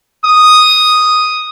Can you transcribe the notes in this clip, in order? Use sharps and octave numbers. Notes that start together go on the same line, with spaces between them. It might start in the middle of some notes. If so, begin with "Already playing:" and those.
D#6